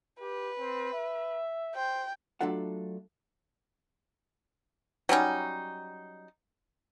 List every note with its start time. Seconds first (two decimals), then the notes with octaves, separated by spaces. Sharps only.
0.20 G4 B4
0.59 C4
0.93 E5
1.75 C5 G5
2.41 F#3 A3 D4 F4 A4 F#5
5.09 F#3 G3 C#4 D#4